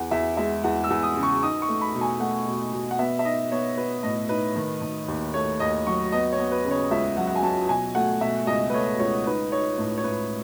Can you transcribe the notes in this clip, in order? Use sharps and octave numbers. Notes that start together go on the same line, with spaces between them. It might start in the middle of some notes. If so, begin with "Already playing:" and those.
Already playing: E2 F#5
E2 E5
G#3 E5
E2 F#5
E6
E2
D#6
C#3
C#6
D#4 D#6
C#6
A3
B5
B2
G#5
A3 F#5
B2
B2
F#5
B3 E5
E5
D#4 D#5
B3 C#5
B3 B4
A2 D#5
D#4 B4
D#3
D#3
D#2
A3 C#5
D#2 D#5
F#3 C#6
B3 D#5
C#5
B3
B4
C#3
C#5
C#2 E5
F#3 F#5
F#5
G#5
F#3 A5
B2 G#5
A3 F#5
B2 E5
C#2 D#5
B4
A3 C#5
C#2 C#5
D#4 B4
D#4 C#5
A2 B4
C#5
A2 B4